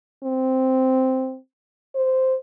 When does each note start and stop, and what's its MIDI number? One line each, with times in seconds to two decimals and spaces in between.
0.23 1.37 60
1.95 2.36 72